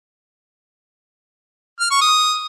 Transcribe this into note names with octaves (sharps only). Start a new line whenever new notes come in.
F6
C#6
D#6